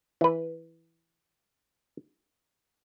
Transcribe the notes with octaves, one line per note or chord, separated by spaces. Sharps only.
E3 B4